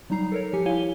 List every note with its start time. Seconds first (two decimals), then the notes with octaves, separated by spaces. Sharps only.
0.10 F#3 G3 D#4 A#5 C7
0.32 A4 A#4 C#5
0.53 F3 G4 G#5 C#7
0.66 E4 C#5 F5 G#5 D#7 G7